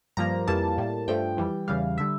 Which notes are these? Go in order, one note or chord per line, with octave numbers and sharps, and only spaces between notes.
G2 F3 A#3 A#5
F2 E3 G3 A#3 A5
A2 G3 A#3
G2 F3 A3 G5
F2 E3 G3
E2 C#3 E3 G3 F5
D3 G3 E5